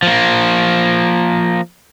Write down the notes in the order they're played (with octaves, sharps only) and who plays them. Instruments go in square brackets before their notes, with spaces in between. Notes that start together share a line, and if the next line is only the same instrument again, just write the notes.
[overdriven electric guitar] F3 A#3